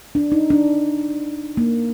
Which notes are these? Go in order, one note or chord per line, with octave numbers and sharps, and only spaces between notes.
D4
D#4
D4
A#3